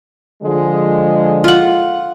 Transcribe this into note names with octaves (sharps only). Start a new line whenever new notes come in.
D3 F3 G#3
F4 F#5